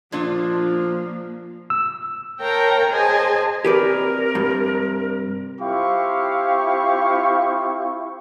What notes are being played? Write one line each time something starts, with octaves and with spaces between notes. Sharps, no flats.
A#2 F3 A#3 D4 F4
E6
A#4 C#5 F5 G5 A5 A#5
G#4 C5 D#5 G#5 A5
C3 G4 A#4 B4 D5
G2
C4 E4 F4 G4 F5 C#6